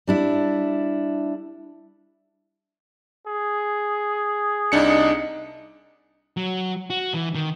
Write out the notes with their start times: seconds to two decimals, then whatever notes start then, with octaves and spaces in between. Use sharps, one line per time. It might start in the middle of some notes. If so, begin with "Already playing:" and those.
0.07 G3 D4 E4
3.27 G#4
4.72 C2 D4 D#4 C#7
6.37 F#3
6.90 F#4
7.14 E3
7.35 D#3